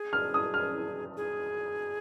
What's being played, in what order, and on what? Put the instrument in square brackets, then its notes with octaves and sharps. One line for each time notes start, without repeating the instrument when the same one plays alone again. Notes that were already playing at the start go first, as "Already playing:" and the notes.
Already playing: [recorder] G#4
[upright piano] F6
D#6
F6
[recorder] G#4